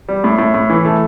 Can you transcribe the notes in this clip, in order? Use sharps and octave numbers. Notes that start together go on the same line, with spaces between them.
G3
A2
A2
A2
E3
A3